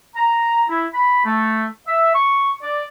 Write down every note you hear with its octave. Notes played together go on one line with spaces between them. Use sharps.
A#5
E4
B5
A3
E5
C#6
D5